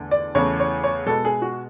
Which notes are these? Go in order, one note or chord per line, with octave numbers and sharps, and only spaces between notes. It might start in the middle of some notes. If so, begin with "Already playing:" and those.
Already playing: E2 D3 A3
D5
E2 C#3 E3 A3 C#5
C#5
C#5
B2 G#3 B3 A4
G#4
F#4